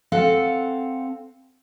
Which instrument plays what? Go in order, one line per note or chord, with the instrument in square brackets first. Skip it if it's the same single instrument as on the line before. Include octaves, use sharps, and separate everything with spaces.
[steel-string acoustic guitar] C4 A4 F5 F#5